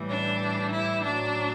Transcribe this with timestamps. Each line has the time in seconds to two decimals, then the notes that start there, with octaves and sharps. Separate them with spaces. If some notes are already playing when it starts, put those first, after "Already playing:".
Already playing: A2 E3 G3
0.10 D4
0.72 E4
1.03 A2 F#3 D4